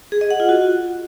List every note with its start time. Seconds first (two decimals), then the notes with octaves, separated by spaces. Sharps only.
0.12 G#4
0.21 D#5
0.31 F#5
0.40 F4
0.49 F#4